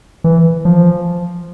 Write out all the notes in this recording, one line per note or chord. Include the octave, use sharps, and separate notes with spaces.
E3
F3